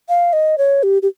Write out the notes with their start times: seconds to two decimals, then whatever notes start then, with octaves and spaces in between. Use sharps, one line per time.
0.09 F5
0.33 D#5
0.58 C#5
0.83 G4
1.02 G4